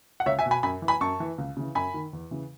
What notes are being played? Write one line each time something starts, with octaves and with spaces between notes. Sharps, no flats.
F#5
C#2 C#5 E5
E5 G#5
B2
G#5 B5
F#2 G#5 B5
E3
G#5 B5
F#2 A5 C#6
E3
C#2
C#3 E3
F#2 G#5 B5
D#3
E2
C#3 E3